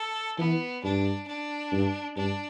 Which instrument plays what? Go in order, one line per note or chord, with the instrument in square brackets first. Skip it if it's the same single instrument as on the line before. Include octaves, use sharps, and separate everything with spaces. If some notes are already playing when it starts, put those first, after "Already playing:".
Already playing: [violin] A4
[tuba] E3 [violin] B3
[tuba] G2 [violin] D4
[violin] D4
[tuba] G2
[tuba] G2 [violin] D4